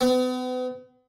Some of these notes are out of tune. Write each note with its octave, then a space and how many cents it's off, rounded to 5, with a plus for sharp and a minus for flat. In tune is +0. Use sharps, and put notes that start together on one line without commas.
B3 +40